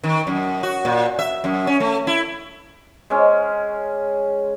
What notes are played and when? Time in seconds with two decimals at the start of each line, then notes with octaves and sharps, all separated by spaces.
0.03 D#3
0.27 F#2
0.63 F#4
0.85 A#2
1.19 E5
1.44 F#2
1.67 C#4
1.80 A3
2.07 E4
3.10 G#3 C#4